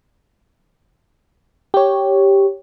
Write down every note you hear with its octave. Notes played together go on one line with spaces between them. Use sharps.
G4 C#5